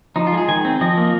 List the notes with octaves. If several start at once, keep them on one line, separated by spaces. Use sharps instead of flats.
F3 D#4
F4
G#3 G#4
D#3 G#5
C4
F3 D#5
A#3